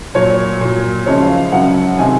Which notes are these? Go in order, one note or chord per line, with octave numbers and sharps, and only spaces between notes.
A#2 F#3 C#5
A#2 F#3
F#2 C#3 F3 G#3 C#5
F5
F5
F#2 C#3 F#3 F#5
C3 D#3 G#3 G#5